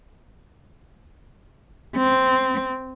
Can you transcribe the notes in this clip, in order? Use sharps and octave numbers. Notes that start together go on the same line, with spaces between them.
C4